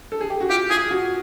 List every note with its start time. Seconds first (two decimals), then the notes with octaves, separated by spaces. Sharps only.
0.12 A4
0.21 G#4
0.30 G4
0.41 F#4
0.50 F4 G4
0.70 F4 G#4
0.91 F#4